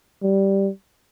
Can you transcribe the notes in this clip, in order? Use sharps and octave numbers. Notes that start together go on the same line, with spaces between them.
G3